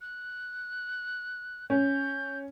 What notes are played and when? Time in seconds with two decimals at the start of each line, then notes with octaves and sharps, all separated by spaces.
0.01 F#6
1.70 C#4 G6